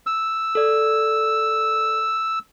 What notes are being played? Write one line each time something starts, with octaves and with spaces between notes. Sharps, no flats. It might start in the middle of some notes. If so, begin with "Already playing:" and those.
E6
A4 D5